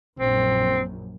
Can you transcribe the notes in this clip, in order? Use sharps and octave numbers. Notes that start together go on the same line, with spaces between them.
A#1 F#2 C4